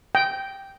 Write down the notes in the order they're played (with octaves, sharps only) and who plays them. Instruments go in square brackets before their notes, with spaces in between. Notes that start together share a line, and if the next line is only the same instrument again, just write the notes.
[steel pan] G5